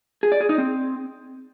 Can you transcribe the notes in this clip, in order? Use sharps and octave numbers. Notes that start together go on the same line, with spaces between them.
G#4
D5
G#4
D#4
C4